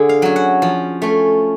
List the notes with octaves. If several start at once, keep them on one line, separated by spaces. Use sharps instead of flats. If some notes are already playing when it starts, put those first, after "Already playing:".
Already playing: D3 G#4
F5
F#3 C#4
F#5
F3
A3 C#4